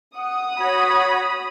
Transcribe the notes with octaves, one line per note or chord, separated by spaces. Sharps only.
F#5 D#6
F#4 C#5 B5